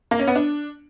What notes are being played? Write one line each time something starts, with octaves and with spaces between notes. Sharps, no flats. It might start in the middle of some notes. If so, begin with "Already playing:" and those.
A#3
C#4
B3
D4